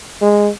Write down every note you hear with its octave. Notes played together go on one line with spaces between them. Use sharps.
G#3